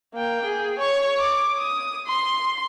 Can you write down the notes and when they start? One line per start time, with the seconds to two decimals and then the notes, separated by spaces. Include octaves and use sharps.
0.14 A#3 G5
0.45 G#4
0.79 C#5 C#6
1.21 D6
1.59 D#6
2.07 C6